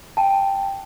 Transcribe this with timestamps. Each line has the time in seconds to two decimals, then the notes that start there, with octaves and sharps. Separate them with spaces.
0.17 G5 A5